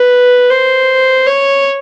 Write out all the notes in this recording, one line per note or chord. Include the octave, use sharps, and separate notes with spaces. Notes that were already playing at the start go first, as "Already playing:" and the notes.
Already playing: B4
C5
C#5